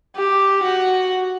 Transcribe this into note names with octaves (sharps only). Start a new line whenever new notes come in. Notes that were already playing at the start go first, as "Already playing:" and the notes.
G4
F#4